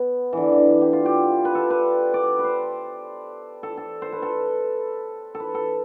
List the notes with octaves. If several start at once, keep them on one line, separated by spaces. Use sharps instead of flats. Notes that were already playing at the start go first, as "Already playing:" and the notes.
Already playing: B3
D3 E3
E3
D4
G4
F4
G4
B4
A4
B4
D5
B4
C5
A4
A4
C5
B4
A4
A4
B4
A4